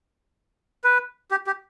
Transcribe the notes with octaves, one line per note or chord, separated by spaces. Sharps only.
B4
G4
G4